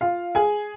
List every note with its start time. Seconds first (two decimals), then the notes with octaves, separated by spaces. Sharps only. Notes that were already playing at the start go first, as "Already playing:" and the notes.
0.01 F4 F5
0.35 G#4 G#5